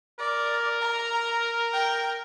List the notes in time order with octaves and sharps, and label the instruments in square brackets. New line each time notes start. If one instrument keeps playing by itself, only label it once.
[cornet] A#4 [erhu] D5
[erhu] A#5
G5